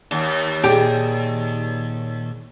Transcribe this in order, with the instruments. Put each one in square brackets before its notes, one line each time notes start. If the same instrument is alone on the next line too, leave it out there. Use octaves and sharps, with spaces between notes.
[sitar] D#2
[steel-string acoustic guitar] A#2 G#4 D#5 [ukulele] G4